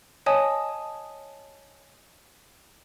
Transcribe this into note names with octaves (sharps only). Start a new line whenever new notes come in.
C#5 D#5 G#5 A5 D#6